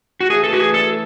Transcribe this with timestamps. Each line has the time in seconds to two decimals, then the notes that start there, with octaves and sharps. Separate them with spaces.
0.20 F#4
0.30 C#3 E3 A3 G#4
0.44 A4
0.53 F#4
0.59 G#4
0.73 E3 A3 D4 A4